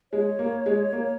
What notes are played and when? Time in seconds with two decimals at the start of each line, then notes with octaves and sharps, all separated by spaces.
0.12 G#3 C#5
0.39 A#3
0.66 G#3
0.93 A#3